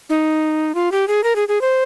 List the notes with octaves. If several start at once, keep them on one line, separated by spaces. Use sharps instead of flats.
D#4
F4
G4
G#4
A#4
G#4
G#4
C5